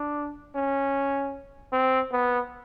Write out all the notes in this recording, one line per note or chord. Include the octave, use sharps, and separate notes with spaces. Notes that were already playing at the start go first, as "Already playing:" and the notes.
Already playing: D4
C#4
C4
B3